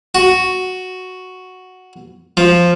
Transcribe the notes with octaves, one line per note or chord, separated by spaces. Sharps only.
F#4
F3